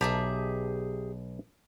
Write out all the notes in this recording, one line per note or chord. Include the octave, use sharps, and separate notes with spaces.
B1 G4 G#4 E5 A5 A#5